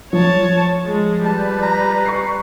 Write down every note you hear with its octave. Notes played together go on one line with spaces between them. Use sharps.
F3 C#5 A5
G#3
G3 B4 A5
A#5
C#6 C7